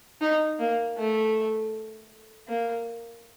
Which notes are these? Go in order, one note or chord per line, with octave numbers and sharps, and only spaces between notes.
D#4
A#3
A3
A#3